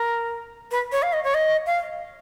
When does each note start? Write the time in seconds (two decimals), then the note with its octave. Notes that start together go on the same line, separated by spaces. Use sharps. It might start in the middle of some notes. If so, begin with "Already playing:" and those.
Already playing: A#4
0.71 B4
0.92 C#5
1.02 F5
1.13 D#5
1.24 C#5
1.34 D#5
1.66 F5